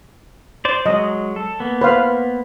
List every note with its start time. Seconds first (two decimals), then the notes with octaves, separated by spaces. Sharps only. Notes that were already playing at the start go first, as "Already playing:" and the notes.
0.65 C5 D5
0.86 F#3 G#3 D#5
1.36 A4
1.60 A#3 B3
1.81 B4 C5 F5